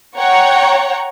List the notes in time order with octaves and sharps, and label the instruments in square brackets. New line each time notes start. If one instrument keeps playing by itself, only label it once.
[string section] C#5 F#5 G5 A#5 C#6